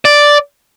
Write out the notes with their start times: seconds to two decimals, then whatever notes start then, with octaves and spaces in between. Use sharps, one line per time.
0.05 D5